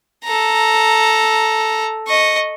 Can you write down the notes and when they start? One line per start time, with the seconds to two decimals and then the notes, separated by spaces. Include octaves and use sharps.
0.24 A4 A#5
2.07 D#5 C#6